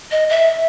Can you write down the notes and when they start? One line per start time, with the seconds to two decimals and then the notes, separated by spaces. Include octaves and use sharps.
0.11 D#5
0.29 E5